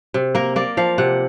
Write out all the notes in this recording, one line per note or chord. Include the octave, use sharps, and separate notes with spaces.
C3
A#3 A#4
A#3 D5
F3 F5
C3 F#5